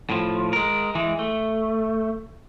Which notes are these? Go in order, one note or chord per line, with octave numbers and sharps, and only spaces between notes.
A2 F3
G#3 A#4
E3 G#3
A3